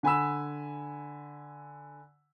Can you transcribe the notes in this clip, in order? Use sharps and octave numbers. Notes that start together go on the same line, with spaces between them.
D3 G#5 B5 E6